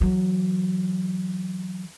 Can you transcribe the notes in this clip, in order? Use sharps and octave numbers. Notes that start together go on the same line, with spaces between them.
E3 F#3